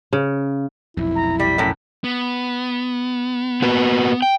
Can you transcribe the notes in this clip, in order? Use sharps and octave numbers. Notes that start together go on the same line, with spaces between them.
C#3
F1 B1 F2 E4
A#5
G3 B6
F#2 A2
B3
A#3 F#4 B4
G5